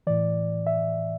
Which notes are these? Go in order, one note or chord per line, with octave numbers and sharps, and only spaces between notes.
A2 E3 D5
E5